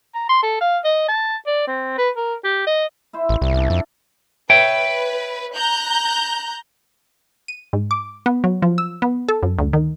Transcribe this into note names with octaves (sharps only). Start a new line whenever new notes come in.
A#5
C6
A4
F5
D#5
A5
D5
C4
B4
A#4
G4
D#5
E4 C5 E5
A1
C2
C2 C#4 D4
F2 A4
B4 C#5 E5 G5
A#5 F#6 G6
D#7
G#2
D6
B3
F#3
F3
E6
B3
A4
F#2
D2
D#3